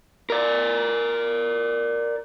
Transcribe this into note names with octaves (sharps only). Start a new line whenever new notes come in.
A#4 D5